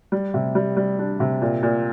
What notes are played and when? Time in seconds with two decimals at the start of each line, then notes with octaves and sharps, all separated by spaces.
0.12 G3
0.34 C3
0.55 G3
0.77 G3
0.99 D4
1.20 C3
1.42 A#2
1.63 A#2